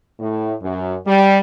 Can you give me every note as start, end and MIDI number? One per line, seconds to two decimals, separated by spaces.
0.20 0.55 45
0.62 0.97 42
1.07 1.40 55